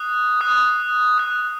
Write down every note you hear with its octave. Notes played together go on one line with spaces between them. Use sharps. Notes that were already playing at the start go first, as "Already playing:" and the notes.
Already playing: D#6 F#6
D#6 F#6
D#6 F#6